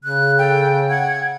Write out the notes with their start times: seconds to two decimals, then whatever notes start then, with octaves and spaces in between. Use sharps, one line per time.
0.04 C#3 F#6
0.39 A4 G5
0.90 F#5 G#6